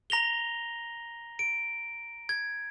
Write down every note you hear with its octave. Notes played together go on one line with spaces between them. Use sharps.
A#5 A#6 F7 G7
D7
G#6